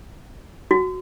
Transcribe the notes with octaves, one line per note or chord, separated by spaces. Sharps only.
F#4